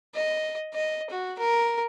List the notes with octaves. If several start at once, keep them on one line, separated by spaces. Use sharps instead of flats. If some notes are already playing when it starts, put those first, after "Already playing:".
D#5
D#5
F#4
A#4